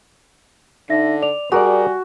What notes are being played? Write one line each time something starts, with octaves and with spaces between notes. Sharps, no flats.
D3 D#4 E5 A#6
D5 F7
G3 F#4 G#4 A#4 D5 G#5